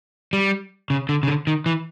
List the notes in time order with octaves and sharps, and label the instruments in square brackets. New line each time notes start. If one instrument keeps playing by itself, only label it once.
[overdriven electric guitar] G3
C#3
D3
C#3
D3
D#3
E3